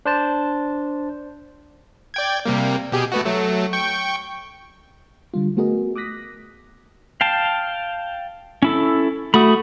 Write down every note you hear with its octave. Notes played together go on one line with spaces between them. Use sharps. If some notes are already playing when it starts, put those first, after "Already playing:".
D4 C5 A5
D5 G5 G#6
C3 G3 A#3
B2 G4 G#4
A3 B3 F#4
F#3 A3
G5 C#6
D3 G3 F4
A3 B3 F#4 G#4 A#4 D#5
D6 D#6 F#6 A#6 B6
F5 G5 A5
C#4 E4 A4
A3 F#4 B5 D#6